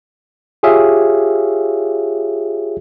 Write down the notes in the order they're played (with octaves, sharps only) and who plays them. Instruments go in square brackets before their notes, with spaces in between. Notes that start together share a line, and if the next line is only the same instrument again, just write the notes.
[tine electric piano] F4 G4 G#4 C#5 E5 F5